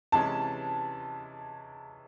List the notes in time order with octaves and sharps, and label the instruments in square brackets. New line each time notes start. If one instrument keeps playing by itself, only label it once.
[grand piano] C3 E3 G#3 C#4 [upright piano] A5